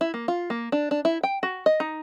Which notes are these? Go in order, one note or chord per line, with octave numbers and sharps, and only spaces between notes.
E4
A#3
F4
A#3
D4
D4
E4
G5
F#4
D#5
D#4